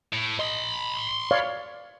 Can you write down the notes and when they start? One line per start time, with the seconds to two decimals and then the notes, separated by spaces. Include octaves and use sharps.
0.13 A2
0.39 D#5 B5 C6
1.31 C#5 D5 F5